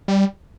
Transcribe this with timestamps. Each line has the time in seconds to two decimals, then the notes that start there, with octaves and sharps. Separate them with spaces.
0.08 G3